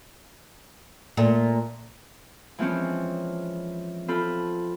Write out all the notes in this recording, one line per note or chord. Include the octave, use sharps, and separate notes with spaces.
A#2 A3
E3 F3 G#3 C4 C#4
C4 F4 A4 B5